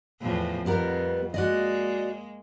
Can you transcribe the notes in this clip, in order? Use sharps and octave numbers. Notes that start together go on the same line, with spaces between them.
E2 A2 F3
F2 G3 B3 A#4
G#3 A#3 F#4 D5 D#5